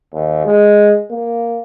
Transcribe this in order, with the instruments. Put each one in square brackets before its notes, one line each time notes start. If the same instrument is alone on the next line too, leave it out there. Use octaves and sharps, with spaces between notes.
[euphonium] D#2
G#3
A#3